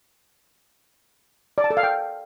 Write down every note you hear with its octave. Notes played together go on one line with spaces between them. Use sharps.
D5
A5
A4
F5
G5